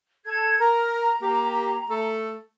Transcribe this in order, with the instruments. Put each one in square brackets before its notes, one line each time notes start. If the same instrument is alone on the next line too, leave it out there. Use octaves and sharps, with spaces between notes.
[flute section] A4 G#6
[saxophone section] A#4 [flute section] A#5
[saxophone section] A#3 G4
A3 A4